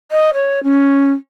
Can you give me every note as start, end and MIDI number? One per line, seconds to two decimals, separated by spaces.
0.11 0.30 75
0.34 0.63 73
0.63 1.12 61